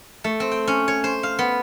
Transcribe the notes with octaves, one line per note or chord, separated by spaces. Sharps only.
A3
C4
G5
C#4
C#5
C5
F5
B3